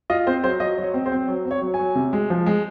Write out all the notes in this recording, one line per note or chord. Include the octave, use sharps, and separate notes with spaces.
F4 D#5
C4 C5
F#3 C5
F#3 D#5
F#3
C#5
C4
C5
C4
F#3
C4
C#5
F#3
G#5
F#3
C3
G#3
F3
G#3